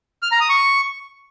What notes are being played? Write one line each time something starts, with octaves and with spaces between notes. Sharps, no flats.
F6
A#5
D#6
C#6